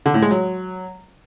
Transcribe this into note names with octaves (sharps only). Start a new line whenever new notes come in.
D3
A2
G#3
F#3